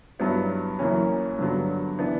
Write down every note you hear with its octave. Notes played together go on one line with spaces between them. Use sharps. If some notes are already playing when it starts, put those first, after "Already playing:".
G2 F#3 B3 E4
F#2 E3 A#3 C#4
G2 D3 F#3 B3
E3 B3 D4